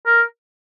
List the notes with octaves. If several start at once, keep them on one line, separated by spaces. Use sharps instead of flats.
A#4